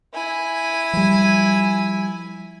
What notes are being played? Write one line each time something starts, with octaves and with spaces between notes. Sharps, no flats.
E4 G#5
F3 G3